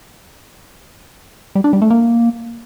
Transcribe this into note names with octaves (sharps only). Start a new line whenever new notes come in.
G3
D4
G3
A3
A#3